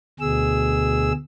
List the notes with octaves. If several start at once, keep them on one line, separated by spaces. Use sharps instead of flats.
D2 B2 G#4 E6